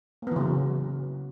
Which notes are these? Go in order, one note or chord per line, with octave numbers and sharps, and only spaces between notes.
C#3 E3 F#3 A#3 B3